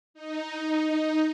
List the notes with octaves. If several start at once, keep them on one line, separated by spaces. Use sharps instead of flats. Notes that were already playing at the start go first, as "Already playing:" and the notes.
D#4